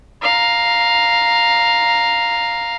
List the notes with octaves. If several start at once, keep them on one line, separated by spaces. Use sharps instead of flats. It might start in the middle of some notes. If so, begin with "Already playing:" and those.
F5 A#5